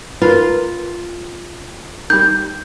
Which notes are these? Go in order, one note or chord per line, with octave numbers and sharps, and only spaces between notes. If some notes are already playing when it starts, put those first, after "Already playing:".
F4 A#4 B4
D#3 G3 G6